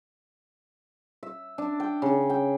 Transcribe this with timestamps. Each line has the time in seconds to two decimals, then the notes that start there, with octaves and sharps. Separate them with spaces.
1.23 E5
1.58 D4
1.80 G5
2.02 C#3
2.30 G5